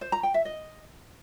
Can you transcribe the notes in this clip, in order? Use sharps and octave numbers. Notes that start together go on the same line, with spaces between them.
C5
A#5
G5
E5
D#5